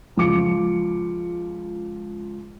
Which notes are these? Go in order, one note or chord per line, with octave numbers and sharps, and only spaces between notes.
C#2 F3 F4 D6 C#7